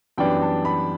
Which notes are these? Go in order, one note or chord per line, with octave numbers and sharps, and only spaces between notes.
F#2 E3 G3 B3 D4 G5
A5
B5